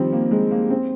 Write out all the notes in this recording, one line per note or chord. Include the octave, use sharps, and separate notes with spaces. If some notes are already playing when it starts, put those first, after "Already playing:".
Already playing: D#3 F3 G3 C4
A#3
G#3
A#3
C4